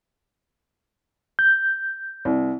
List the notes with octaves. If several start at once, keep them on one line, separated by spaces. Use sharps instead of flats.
G6
C2